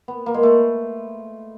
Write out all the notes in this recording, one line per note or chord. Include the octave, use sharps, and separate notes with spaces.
B3
A#3
G#3
A3